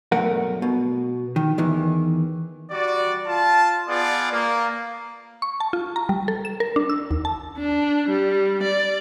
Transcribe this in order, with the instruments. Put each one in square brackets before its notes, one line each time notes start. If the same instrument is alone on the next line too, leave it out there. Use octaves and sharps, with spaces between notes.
[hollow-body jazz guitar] B1 G2 A3 A#4 F#5
B2
D#3
E2 D#3 E3
[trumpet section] G3 F#4 D5
F4 A5
B3 F4 G#4 D5
A#3
[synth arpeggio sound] C#6
A5
F4
A#5
G3
A4
E7
A#4
D4
E6
D#2
A5
[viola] D4
G3
D5